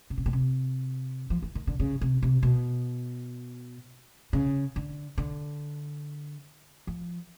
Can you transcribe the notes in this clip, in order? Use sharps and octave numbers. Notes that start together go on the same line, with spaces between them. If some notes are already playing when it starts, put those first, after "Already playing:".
C#3
C3
B2
C3
F3
E3
D#3
D3
C#3
C3
C3
B2
C#3
D3
D3
F3